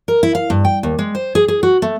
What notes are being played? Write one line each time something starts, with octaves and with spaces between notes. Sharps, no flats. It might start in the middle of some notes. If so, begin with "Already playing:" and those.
A#4
E4
F5
G2
G5
D#2
G#3
C5
G#4
G#4
F#4
A3